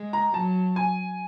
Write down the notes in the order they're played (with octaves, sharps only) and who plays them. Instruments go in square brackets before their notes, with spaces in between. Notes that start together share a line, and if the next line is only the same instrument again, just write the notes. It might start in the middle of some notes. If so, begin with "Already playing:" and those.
Already playing: [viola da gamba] G#3
[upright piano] A#5
[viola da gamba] F#3 [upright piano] A5
[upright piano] G#5